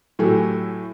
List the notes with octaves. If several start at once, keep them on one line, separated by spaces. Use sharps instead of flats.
A2 F#3 A3 G4 A4 G#5